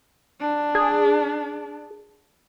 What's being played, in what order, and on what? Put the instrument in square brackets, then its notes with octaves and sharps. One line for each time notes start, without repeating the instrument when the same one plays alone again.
[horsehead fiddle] D4
[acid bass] G#4